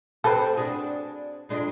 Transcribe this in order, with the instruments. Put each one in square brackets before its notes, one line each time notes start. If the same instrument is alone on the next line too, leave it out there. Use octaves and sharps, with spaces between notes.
[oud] C4 G4 C5 [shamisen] A4 B4
[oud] D4 F#4 G#4
F2 G#3 D4